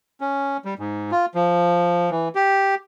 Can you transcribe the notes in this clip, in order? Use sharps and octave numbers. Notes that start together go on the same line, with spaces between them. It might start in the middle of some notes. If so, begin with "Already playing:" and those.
C#4
G3
G#2
F4
F3
E3
G4